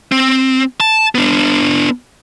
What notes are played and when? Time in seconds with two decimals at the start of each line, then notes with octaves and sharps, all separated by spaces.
0.12 C4
0.80 A5
1.15 B3 D4